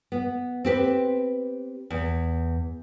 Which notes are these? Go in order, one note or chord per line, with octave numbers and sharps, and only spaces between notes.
B3
C4 G4 B4
E2